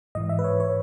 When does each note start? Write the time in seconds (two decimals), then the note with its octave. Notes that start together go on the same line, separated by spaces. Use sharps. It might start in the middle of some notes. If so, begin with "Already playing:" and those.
0.15 G#2 E3 D#5
0.29 E5
0.39 B4
0.44 C#5
0.60 C#5